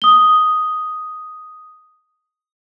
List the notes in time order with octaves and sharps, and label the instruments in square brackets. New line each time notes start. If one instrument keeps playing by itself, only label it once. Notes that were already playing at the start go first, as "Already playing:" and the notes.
[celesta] D#6 G7